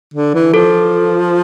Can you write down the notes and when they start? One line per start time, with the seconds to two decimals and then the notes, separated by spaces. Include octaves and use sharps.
0.14 D3
0.34 E3
0.53 F3 A4